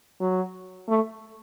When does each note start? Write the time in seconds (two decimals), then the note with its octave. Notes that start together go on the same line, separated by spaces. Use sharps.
0.21 F#3
0.89 A3